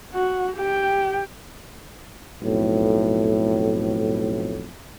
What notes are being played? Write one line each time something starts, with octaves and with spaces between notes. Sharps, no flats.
F#4
G4 G5
B1 F2 A2